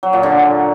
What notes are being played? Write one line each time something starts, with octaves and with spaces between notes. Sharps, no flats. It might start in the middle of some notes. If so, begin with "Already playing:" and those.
F#3
A#2
D3